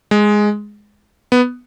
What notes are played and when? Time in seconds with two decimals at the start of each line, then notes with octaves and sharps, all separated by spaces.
0.11 G#3
1.32 B3